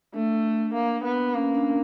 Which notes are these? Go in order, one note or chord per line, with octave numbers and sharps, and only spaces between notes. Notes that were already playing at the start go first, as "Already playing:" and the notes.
A3 D4
A#3
B3
A#3 C#4
D4